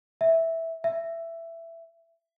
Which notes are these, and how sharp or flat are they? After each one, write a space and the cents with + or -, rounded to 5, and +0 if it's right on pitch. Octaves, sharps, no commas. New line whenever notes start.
E5 -10
E5 +10